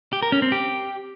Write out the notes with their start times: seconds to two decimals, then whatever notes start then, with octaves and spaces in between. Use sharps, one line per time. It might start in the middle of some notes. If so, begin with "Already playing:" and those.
0.13 G4
0.22 A#4
0.32 C#4
0.42 C4
0.52 G4